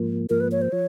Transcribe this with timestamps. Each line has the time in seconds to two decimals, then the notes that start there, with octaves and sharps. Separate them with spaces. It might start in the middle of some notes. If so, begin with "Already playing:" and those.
Already playing: G#2 F3 A#3
0.30 G#2 F3 A#3 A#4
0.40 B4
0.52 C#5
0.62 C5
0.72 F3 C#5